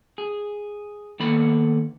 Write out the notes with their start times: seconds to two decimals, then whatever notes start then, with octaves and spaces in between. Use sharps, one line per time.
0.18 G#4
1.20 D#3 A#3 B3 A4 B5